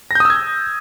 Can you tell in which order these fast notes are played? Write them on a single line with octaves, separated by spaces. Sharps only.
A#6 G6 D#6 E6 G#6